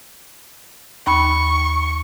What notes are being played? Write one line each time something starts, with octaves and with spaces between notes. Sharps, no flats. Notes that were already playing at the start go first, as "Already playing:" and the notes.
D#2 B5 C#6